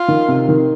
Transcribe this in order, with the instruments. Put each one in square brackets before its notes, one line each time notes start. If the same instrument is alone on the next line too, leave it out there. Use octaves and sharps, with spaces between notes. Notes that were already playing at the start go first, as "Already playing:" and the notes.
Already playing: [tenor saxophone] F4
[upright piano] D#3
C3
D#3